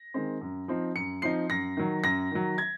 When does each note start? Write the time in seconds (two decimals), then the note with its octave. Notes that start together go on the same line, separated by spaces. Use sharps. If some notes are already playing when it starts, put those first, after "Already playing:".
Already playing: A#6
0.14 D#3 G#3 C4
0.41 F#2
0.68 F3 C4 D#4
0.95 F#2 C#7
1.22 F3 C4 D#4 C7
1.50 F#2 A#6
1.77 D#3 F#3
2.04 F#2 A#6
2.31 D#3 F#3
2.58 G#6